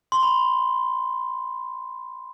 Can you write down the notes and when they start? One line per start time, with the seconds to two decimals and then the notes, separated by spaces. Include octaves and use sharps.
0.12 C6
0.23 B5